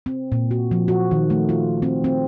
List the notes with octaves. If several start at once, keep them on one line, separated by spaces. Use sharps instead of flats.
C4
A#2
F#4
F3
F#4
D#3
A3
F4
C4
C4